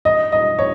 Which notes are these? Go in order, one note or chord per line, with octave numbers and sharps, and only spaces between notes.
D#5
D#5
C#5